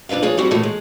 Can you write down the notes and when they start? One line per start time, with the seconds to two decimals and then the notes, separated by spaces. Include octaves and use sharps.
0.09 F2 D4 B4 E5 F5
0.22 F3 G#4 B4 C#5 F5
0.37 G3 B3 C4 E4 F#4
0.51 A2 E3 A3 A#3
0.63 G#3